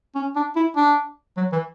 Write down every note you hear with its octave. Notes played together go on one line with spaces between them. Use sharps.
C#4
D4
E4
D4
F#3
E3